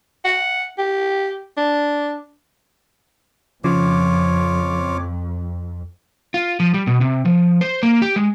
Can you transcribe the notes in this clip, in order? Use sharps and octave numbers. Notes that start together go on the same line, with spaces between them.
F#5
G4
D4
F2 C#3 F3 F4 C#5 D6
F4
F3
G3
B2
C3
F3
C5
A#3
G4
G#3